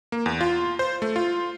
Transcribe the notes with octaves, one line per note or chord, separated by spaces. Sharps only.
A#3
E2
F4
C5
A3
F4